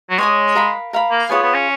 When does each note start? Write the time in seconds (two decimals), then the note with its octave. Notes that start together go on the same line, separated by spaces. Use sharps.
0.10 F#3
0.18 G#3 C#5 G#5 D#6
0.55 A#4 F5 B5
0.93 A#4 F5 B5
1.11 A#3
1.29 B3 F4 G#4 C#5 G#5
1.42 B3
1.54 C#4